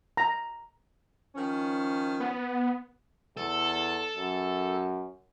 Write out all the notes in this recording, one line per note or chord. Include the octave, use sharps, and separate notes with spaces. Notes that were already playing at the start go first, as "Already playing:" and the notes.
A#5
D#3 F3 C#4
B3
E2 A4
F#2